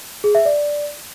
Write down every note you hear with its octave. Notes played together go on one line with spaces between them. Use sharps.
G#4
E5
D5